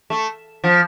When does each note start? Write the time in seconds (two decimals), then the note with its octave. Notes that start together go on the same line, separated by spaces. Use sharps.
0.10 A3
0.64 F3